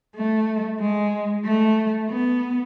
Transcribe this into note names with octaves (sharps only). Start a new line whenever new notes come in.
A3
G#3
A3
B3